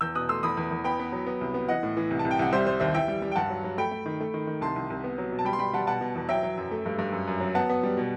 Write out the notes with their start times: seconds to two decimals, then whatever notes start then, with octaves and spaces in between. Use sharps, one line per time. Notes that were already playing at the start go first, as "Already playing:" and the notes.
0.01 E2 E6 G6
0.15 B2 D#6 F#6
0.29 A3 C6 E6
0.43 E2 B5 D#6
0.57 E2
0.71 E2
0.84 B3 G5 B5
0.99 B3
1.12 F#3
1.26 B3
1.41 C2
1.54 B3
1.69 E3 D#5 F#5
1.83 A2
1.97 E3
2.11 C2
2.19 A5
2.25 C2
2.31 G5
2.39 C2 F#5
2.53 G3 C5 E5
2.66 G3 C5
2.80 D#2 C5 E5
2.94 E3 E5 G5
3.08 G3
3.22 G3
3.32 G5
3.36 G2 F#5 A5
3.50 F#3
3.64 F#3
3.78 A3 G5 B5
3.91 A3
4.06 D#3
4.21 A3
4.34 D#3
4.47 D#3
4.61 C2 A5 C6
4.76 C2
4.90 C2
5.04 B3
5.18 F#3
5.32 B2
5.39 A5
5.45 G3 G5 B5
5.53 C6
5.59 G3 G5 B5
5.73 G3 F#5 A5
5.87 B2 F#5 A5
6.01 B2
6.15 E2
6.29 F#3 E5 G5
6.43 F#3
6.58 F#2
6.71 A3
6.86 G2
6.99 G2
7.12 F#2
7.28 F#2
7.40 F#3
7.55 B3 F#5 A5
7.69 B3
7.83 G3
7.97 B2